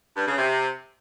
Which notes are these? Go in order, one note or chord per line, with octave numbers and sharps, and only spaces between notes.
G2
C#3
C3